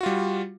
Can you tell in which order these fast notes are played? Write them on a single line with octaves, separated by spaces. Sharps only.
F#4 F4 G3